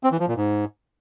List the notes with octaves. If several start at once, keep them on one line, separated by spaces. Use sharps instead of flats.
C4
E3
F3
A#2
G#2